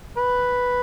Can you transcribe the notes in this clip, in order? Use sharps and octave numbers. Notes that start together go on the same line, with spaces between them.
B4